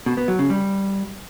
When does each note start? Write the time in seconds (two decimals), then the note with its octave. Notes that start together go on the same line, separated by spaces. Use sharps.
0.06 B2
0.17 B3
0.28 F#3
0.39 C#3
0.50 G3